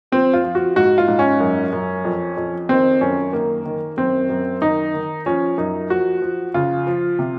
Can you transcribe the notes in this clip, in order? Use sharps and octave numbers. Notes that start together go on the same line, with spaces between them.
F3 C4
F4
F3
F#4
G#2 F#4
F4
G#2
C#4
F#2
F#2
F2
F2
D#3 C4
F#2 C#4
D#3 A#3
D#3
F#2 C4
F#2
D#3 D#4
D#3
F3 C#4
F#2 D#4
F3 F#4
F3
C#3 F4
F3
C3